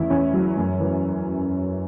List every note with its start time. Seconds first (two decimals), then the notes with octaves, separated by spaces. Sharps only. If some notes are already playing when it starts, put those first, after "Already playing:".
Already playing: E2 C#3 E4
0.10 E2 C#4
0.33 F#3
0.57 F#2
0.80 E3